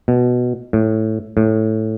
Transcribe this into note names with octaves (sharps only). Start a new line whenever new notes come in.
B2
A2
A2